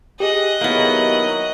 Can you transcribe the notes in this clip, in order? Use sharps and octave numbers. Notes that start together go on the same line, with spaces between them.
G4 G#4 D#5 F#6
D#3 F#3 A#3 B3 E4